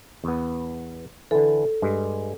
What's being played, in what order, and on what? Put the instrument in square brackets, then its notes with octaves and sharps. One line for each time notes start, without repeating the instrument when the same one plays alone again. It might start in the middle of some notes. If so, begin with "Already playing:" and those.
[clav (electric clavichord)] E2 B3
[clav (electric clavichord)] D3 E3 [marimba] A4
[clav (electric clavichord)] G2 G#3